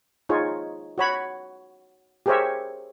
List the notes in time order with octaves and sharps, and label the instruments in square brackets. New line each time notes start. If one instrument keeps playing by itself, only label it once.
[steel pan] D#4 F4 G#4 C#5
F#4 C#5 B5
G4 G#4 A#4 C5 C#5 E5